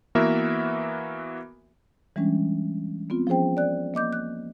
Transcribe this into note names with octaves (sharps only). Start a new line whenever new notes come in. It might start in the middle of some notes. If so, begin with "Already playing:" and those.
E3 A#3 B3 F#4 A#4 E5
E3 G3 G#3 C#4 D4
B3 C4 F4
F3 C#4 G#4 C5 G5
D5 F#6
A#3 D#5 D6 G6
F#6